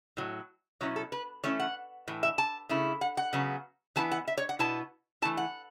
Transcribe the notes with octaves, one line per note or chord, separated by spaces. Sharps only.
A2 F#3
B2 F#3 C#4 E4 C#5
A4
B4
E3 A3 C#4 E4 C#5
F#5
A2 E3
E5
A5
C#3 A3 E4
F#5
F#5
C#3 F#3 B3
E3 B3 E4 A5
F#5
E5
C#5
F#5
B2 B3 E4 A5
E3 A3 E4 A5
F#5